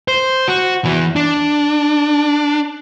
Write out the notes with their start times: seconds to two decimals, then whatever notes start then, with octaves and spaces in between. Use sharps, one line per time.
0.08 C5
0.48 F#4
0.85 E3 B3
1.16 D4